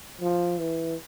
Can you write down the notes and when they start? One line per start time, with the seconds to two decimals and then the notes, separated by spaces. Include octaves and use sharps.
0.21 F3
0.60 E3